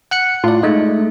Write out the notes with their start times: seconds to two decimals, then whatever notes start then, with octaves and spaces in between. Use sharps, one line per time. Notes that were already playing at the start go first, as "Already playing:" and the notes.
0.11 F#5 F#6 C#7
0.44 A2 F4 D5
0.63 G#3 A3 D#4